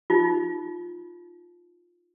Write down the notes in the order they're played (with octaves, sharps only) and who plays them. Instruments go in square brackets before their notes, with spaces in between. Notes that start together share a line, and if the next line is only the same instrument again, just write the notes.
[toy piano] D#4 F4